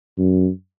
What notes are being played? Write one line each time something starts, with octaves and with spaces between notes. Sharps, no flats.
F#2